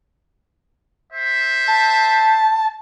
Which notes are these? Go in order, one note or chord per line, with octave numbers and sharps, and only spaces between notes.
C5 E5
A5